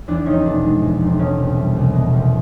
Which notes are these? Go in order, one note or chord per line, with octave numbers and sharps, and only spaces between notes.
E2 D4
F1 C#4 D#4
B2 D4
G#3
E2
F1
B2 C#4
C2
G3
C2
B2
C2